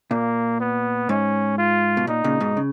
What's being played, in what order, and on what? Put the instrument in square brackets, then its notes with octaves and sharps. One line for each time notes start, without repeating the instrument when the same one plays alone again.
[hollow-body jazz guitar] A#2 [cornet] A#3
[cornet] B3
[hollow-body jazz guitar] G#2 [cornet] C#4
[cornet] F4
[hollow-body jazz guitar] B2
[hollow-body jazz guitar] A#2 [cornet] D#4
[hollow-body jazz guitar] A#2 C#3
G#2 B2
C#3